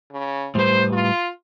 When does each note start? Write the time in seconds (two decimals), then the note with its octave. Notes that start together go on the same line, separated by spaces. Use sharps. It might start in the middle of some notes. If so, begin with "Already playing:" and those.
0.12 C#3
0.55 A2 G3 B4 C5
0.93 F4